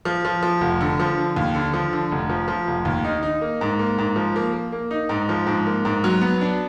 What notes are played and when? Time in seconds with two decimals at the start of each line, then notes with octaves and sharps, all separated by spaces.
0.05 F3
0.25 F3
0.43 F3
0.61 F1
0.81 D3
1.00 F3
1.18 D3
1.36 D#2
1.54 D3
1.74 F3
1.92 D3
2.12 F1
2.30 F3
2.48 F3
2.67 F1
2.85 D#2
3.04 D#4
3.23 D#4
3.41 A#3
3.61 G#2
3.79 A#3
3.98 G#2
4.16 F3
4.36 A#3
4.53 A#3
4.72 A#3
4.91 D#4
5.09 G#2
5.29 F3
5.47 G#2
5.67 A#3
5.85 G#2
6.04 F#3
6.21 B3
6.41 D4